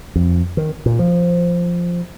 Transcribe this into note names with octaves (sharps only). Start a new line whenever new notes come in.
F2
D#3
A#2
F3